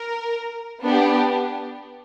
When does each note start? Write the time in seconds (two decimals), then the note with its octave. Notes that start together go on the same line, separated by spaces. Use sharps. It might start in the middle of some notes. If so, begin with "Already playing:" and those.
Already playing: A#4
0.82 B3 D4 G4